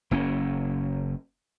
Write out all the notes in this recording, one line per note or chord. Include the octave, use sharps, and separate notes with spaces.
F#1 A#3 C#4